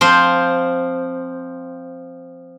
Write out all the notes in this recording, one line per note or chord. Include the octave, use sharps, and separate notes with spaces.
F3 C4 C5